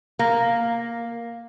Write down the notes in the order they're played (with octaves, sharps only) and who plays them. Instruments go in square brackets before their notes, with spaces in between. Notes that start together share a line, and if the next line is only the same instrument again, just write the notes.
[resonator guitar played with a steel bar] A#3